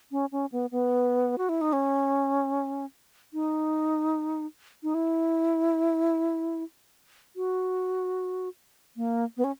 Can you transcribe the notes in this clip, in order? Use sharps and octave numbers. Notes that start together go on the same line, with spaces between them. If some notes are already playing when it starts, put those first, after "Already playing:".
C#4
C#4
B3
B3
F#4
E4
D#4
C#4
D#4
D#4
E4
F#4
A#3
B3
C#4